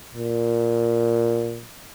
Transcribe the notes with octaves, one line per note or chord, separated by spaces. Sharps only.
A#2